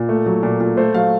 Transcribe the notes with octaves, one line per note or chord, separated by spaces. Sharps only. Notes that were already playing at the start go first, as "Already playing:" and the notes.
Already playing: A#2
A3
F#3
A#2
A#2
A3 C5
F#3 F5